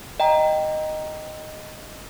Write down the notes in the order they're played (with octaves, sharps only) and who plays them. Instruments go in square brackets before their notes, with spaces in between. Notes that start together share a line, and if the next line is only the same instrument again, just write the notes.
[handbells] D#5 G5 A#5